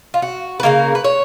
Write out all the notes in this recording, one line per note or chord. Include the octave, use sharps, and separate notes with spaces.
F4
F#4
B4
C#3 F3 A#3 A#4
B4
C#5